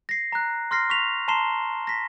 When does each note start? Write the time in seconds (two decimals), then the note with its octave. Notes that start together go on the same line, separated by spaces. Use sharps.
0.09 A#6 C7
0.32 A#5 F#6
0.71 C6 F6 A#6 C7
0.90 C#6 B6 F7
1.28 A5 A#5 C6 C7 E7 G7
1.87 A#6 B6